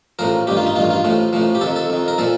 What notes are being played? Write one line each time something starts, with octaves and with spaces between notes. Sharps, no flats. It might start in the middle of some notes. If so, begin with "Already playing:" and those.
A1 A2 F3 A#4
A1 G2 D#3 G4
F4
D#4
A1 G2 D#3 F4
F4
A1 A2 F3
A1 A2 F3
G4
F2 D#3 A4
A4
F2 D#3
A#4
A#2 F3 A4